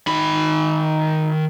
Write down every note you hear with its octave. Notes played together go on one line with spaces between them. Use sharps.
D#3 B5